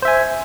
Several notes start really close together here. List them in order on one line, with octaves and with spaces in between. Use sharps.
C5 E5 G#5